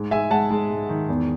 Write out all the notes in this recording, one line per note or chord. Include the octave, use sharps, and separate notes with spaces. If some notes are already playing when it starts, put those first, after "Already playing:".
Already playing: G#2
G#3 E5 G#5
G#3 F#5 A5
G#3
G#2
D#3
E2